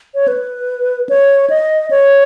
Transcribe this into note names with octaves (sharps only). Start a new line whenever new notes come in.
C#5
B4
C#5
D#5
C#5